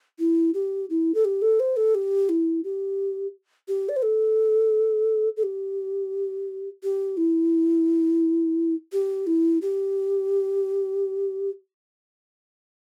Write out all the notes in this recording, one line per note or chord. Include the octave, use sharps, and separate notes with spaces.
E4
G4
E4
A4
G4
A4
C5
A4
G4
E4
G4
G4
D5
C5
A4
A4
G4
G4
E4
G4
E4
G4